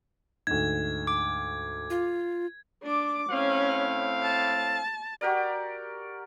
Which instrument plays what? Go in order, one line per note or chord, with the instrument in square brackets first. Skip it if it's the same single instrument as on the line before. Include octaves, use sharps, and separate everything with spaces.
[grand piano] D2 G#2 [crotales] G#6
[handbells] D6
[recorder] F4
[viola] D4 D6
[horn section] A2 C4 F5 [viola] C#4
[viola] A5
[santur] F#4 G4 A#4 D5